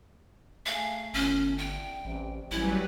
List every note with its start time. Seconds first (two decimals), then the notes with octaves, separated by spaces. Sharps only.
0.66 A3 G#4 F5
1.14 G1 C#4
1.58 D3 G3 G5
2.05 A1 C3 G3
2.51 A1 A2 F#3 G3 E4 G4 B4 G#5